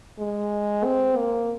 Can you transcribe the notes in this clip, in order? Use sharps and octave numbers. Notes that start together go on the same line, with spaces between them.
G#3
C4
A#3